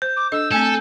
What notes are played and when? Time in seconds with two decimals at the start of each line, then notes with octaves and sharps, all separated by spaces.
0.02 C5 G6
0.16 D6
0.32 D4 A4 D#5 E6
0.52 A3 C4 A4 G#5